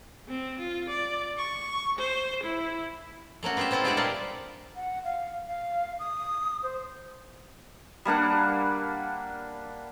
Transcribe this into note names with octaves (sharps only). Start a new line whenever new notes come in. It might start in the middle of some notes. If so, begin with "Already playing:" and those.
C4
F4
D5
C#6
C5
E4
A3 A#3 C#4 F#4
B3 F4 G4 B4 E5
C4 E4 F4 A4 B4
G#3 D4 G4 D5 E5 F#5
A#2 G3 A#4 F5 A5
F#5
F5
F5
D#6
C5
G3 A#3 D4 F#5